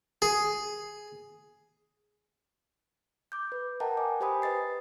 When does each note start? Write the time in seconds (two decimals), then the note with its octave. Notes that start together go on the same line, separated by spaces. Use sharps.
0.22 G#4
3.32 D6 G6
3.52 B4
3.80 A#4 D#5 F#5 G5 A5 A#5
3.97 D#5 G#5 D6
4.20 G4 C5 G5 G#5 B5 D#6
4.42 B4 D#5 A6 C7